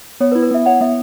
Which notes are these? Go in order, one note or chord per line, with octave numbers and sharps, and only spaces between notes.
B3 C#5
B4
E4
B4
B3 E5
C#5 F#5
B3 E5